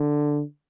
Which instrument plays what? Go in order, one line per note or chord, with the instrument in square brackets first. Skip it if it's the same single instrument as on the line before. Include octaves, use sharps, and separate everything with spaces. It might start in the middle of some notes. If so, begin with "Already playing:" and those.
Already playing: [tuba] D3